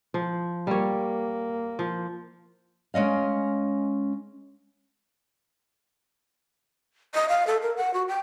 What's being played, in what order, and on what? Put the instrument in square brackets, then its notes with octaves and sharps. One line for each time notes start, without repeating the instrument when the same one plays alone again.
[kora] F3
[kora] G3 C#5 [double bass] A#3
[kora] F3
[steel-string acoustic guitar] G#3 C#4 D#5 F5
[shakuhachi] D#5
F5
A4
A#4
F#5
F#4
G5